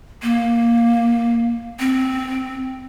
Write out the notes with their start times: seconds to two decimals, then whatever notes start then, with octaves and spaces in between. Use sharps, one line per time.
0.23 A#3
1.80 C4